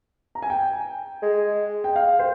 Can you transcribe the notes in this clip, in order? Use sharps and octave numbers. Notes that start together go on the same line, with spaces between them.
A#5
G#5
G5
G#3
G5
F5
C5